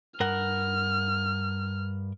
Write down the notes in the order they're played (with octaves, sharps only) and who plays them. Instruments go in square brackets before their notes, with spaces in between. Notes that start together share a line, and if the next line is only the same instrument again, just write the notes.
[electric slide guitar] G2 A#4 F#5 [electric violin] F6